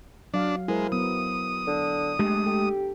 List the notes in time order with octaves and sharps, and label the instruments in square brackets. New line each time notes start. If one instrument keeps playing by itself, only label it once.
[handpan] F#3 F5 [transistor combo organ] D4
[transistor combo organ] G#3 [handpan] E4 A#4 C5
[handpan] F#3 B3 [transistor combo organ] D#6
[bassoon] D3
[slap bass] G#3 A3 [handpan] D4 G4
[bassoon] G4 [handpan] A4